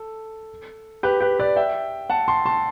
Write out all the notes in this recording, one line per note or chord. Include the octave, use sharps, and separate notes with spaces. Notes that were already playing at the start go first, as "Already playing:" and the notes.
Already playing: A4
G4 B4
G4 B4
B4 D5
E5 G5
F#5 A5
A5 C6
A5 C6